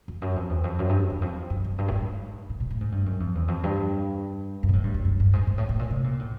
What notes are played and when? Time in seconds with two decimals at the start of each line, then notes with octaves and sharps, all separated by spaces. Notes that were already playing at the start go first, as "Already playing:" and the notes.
0.08 F2
0.22 F#2
0.36 F2
0.49 E2
0.64 F2
0.79 F#2
0.89 G2
1.10 E2
1.22 F2
1.50 F#2
1.64 F#2
1.78 G2
1.88 A2
1.92 G#2
2.49 A2
2.60 A#2
2.70 A2
2.81 G#2
2.92 G2
3.06 F#2
3.20 F2
3.35 E2
3.48 F2
3.63 G2
4.63 F#2
4.69 A#2
4.73 A2
4.84 G2
4.94 F#2
5.05 F#2
5.20 G2
5.33 G#2
5.47 G#2
5.58 A2
5.69 A2
5.79 A#2
5.91 C3
6.04 A#2
6.19 A2